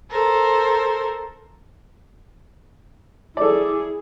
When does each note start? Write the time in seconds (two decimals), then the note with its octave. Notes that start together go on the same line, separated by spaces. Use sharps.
0.10 A4 A#4 C5
3.37 E4 G#4 A4 D5